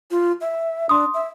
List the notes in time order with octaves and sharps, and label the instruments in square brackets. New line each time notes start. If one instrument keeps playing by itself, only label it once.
[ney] F4
E5
[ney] D4 [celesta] C6 D#6
[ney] E5